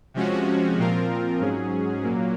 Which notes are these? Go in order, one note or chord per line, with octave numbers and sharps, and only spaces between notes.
C3 F3 G#3 C#4 F#4
A#2 F3 C4 F4 A#4
G#2 F#3 C#4 G#4
A#2 F#3 A#3